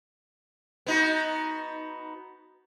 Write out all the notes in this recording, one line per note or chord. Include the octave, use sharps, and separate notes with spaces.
B3 D#4 F#4